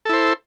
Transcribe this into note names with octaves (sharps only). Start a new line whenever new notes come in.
E4 A4 C5